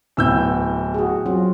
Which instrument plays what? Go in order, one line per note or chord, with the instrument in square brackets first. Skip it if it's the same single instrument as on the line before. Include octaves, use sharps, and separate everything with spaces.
[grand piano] D1 E6 G6 [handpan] B3 C4 E4
[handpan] F#4 G#4
F#3 C4 F4